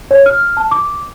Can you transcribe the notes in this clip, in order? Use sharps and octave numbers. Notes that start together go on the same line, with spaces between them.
C#5
F6
A5
D6